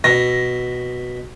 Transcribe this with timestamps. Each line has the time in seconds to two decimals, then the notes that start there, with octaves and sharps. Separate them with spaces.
0.04 B2 A#6